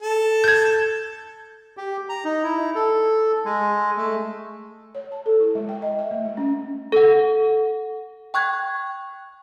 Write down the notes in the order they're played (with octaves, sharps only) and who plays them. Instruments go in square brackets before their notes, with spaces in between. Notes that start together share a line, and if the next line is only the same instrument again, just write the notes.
[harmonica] A4
[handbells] G6 G#6
[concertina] G4
A#5
D#4
E4
A4
G#3
A3
[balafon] C#5
A5
A4
E4
G#3
G5
D#5
E5
A3
G#3
C#4
[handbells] A4 F#5
G5 C#6 F#6 G#6